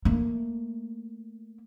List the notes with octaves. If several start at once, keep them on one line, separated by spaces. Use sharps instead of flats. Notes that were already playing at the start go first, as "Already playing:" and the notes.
A3 A#3